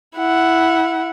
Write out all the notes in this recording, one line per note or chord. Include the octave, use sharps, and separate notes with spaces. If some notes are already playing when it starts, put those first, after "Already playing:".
E4 F#5